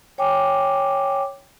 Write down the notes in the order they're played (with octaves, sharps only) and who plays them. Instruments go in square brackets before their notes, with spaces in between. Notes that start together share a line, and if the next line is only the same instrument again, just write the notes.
[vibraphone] C#5 G5 G#5 D6